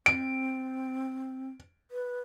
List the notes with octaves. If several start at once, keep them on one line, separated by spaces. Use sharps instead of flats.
C4 D7
B4